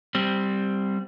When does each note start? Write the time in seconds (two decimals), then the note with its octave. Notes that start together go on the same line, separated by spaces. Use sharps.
0.15 G3 C4